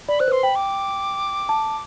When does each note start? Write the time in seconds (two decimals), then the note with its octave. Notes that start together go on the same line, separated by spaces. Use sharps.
0.08 D5 B5
0.20 C5 F#6
0.28 B4
0.32 C5 C6
0.43 G5 B5
0.56 D6
1.49 A5